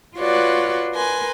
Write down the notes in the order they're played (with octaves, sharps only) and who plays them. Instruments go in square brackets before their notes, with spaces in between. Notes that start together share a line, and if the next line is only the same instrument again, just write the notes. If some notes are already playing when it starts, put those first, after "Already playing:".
[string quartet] F4 F#4 B4 C#5 D5
A#4 B4 G#5 C6